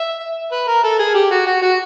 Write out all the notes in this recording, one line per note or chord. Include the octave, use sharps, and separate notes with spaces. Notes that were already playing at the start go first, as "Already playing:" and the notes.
Already playing: E5
B4
A#4
A4
G#4
G4
F#4
F#4
F#4